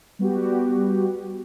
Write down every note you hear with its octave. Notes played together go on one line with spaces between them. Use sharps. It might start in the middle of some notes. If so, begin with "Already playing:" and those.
G3 B3 F#4 G4